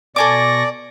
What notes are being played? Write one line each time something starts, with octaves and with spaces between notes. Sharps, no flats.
B2 A4 D5 G#5 C#6 D6 A#6